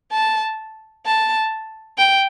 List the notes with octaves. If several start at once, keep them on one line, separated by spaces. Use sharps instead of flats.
A5
A5
G5